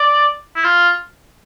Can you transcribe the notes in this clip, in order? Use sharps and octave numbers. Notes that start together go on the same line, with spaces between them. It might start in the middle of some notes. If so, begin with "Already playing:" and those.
Already playing: D5
E4
F4